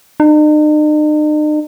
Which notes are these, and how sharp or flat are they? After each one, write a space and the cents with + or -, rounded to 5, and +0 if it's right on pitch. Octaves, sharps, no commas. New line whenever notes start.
D#4 -45